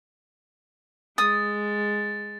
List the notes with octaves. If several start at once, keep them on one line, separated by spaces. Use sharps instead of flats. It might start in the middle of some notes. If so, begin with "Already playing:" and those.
G#3 D#6 A6